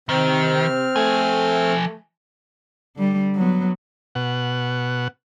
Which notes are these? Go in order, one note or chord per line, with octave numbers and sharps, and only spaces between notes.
C3 D#3 C4 F6
F3 A3 G#5
D3 G3
F#3 B3
B2 F#5